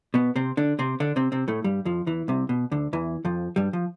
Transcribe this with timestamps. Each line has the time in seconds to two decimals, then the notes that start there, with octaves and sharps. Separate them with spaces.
0.14 B2 B3
0.36 C3 C4
0.57 D3 D4
0.79 C3 C4
1.00 D3 D4
1.16 C3 C4
1.32 C3 C4
1.48 A2 A3
1.64 G2 G3
1.85 F2 F3
2.06 E2 E3
2.28 C2 C3
2.49 B2
2.72 D2 D3
2.93 E2 E3
3.25 F2 F3
3.56 G2 G3
3.73 F3